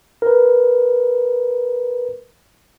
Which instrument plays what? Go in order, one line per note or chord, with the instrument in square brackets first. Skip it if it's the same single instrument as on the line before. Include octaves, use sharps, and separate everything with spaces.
[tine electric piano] A#4 B4